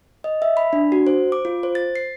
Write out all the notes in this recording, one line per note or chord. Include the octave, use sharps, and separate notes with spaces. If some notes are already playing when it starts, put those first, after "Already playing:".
D#5
E5
B5
D4
F#4
C5
D6
F4
C5
A6
C7